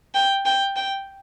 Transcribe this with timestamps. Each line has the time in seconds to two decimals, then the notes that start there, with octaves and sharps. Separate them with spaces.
0.14 G5
0.46 G5
0.76 G5